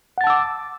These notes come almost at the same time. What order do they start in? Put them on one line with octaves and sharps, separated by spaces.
F#5 A6 A5 E6 D6